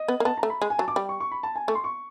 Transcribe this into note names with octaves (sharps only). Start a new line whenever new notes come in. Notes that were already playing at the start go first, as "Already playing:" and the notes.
Already playing: D#5
B3
A#3
B3 A5
A#5
A3
B5
G#3
G#5
F#3 A5
D6
G3
C#6
C#6
B5
A5
G#5
A3 C#6
C6
C#6